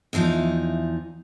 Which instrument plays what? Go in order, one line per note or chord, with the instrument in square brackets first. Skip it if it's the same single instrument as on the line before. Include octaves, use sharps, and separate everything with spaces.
[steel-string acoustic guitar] E2 E3 F3 D#4